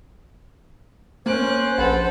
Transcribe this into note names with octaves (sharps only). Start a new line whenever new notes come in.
A#3 C#4 C5 F#6 D7
A#1 A4 B4 F#5